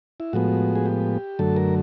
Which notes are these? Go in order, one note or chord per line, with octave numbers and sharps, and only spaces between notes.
E4
A2 F3 G#3 B3 F#4
G#4
G4
F#2 D3 F#3 A3 A4
A#4